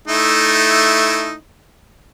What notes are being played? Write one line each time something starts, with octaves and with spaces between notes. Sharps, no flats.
A3 D#4 E4